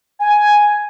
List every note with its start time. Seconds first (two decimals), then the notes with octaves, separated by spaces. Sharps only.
0.19 G#5